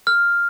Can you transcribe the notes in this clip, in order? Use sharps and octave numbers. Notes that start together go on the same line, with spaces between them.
F6